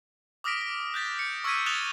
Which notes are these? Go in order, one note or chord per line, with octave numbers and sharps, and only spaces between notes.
D6 D#6 F6 A#6 B6 D7
A#6
F#6 G6 A6 B6
C#7
C#6 E6 F6 G#6 B6 D#7
D#6 F#6 A6 E7 F7 G7